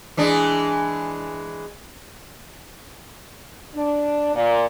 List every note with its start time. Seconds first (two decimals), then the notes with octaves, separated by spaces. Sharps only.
0.17 E3 G#3 D4
3.75 D4
4.35 A#2